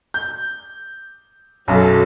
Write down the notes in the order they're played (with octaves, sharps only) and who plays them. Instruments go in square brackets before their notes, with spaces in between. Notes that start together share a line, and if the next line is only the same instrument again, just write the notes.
[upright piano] G6
[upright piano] B1 F#2 [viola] F#3 A4